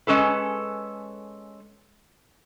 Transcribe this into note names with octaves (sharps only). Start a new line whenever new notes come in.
G#3 C#4 A4 B4